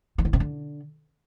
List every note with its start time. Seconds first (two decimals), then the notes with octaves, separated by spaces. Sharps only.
0.18 D#3
0.25 D3
0.33 C3
0.40 D3